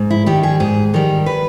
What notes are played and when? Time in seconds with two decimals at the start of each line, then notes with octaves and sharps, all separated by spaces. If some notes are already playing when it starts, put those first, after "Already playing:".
Already playing: G#2
0.10 E4
0.26 D#3 G3 G4
0.43 G#4
0.60 G#2 G#4
0.94 D#3 G3 A#4
1.26 B4